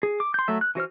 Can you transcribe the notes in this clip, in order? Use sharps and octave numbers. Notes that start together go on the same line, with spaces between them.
G#4
D6
C6 G6
F#3 A3 E5
F#6
E3 F#4 C5 F6